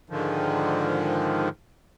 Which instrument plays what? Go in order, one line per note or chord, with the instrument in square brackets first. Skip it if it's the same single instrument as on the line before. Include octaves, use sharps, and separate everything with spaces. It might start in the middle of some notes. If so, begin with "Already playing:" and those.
[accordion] G#2 D3 D#3 F3